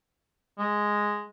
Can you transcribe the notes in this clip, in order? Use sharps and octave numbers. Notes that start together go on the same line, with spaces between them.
G#3